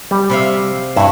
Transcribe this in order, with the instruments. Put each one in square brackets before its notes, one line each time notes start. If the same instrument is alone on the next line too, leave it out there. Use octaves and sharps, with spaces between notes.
[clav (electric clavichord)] G3
[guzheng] C3 E5 F5
[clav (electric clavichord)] G2 E5 [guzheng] E4 F#4